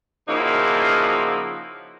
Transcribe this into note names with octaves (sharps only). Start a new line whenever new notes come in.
C#3 F3 A#3 D#4 E4 F#4